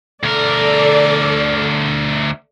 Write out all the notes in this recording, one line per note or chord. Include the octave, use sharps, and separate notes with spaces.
D2 A4 A#4 D5